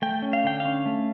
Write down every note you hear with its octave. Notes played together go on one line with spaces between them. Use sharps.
A3 G5
C#4
F5
D3 G5
F5
C#4
A3